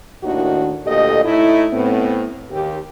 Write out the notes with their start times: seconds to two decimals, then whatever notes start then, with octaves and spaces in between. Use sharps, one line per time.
0.24 D#2 A2 D#3 D4 E4 F#4
0.86 D2 A#2 G4 A4 D#5
1.24 A2 A3 D#4 E4
1.73 A2 B3 C4
2.51 D#2 G4